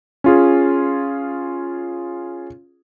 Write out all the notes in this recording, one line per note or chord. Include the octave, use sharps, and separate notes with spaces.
C#4 F4 G#4